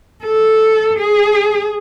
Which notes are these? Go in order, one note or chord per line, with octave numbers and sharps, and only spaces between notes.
A4
G#4